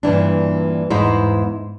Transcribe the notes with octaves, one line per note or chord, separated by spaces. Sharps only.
G2 A#2 E3 D4
E2 G#2 D#4 E4 C5